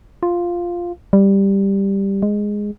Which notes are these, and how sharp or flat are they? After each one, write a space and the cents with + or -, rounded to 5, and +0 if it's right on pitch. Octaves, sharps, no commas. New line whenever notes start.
F4 +0
G3 +5
G#3 -5